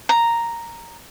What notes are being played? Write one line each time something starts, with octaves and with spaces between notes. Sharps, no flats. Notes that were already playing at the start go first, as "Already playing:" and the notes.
A#5